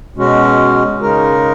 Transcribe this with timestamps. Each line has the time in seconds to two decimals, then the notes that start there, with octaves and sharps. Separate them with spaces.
0.16 B2 G#3 C#4 F#4
1.00 C#3 G#3 D#4 A#4